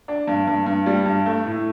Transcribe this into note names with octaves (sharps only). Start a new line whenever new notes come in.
D4
G2
G2
G2
G3
G2
A3
A2